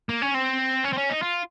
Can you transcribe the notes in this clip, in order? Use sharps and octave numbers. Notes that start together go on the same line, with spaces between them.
A#3
C#4
C4
C#4
C4
C#4
D#4
F4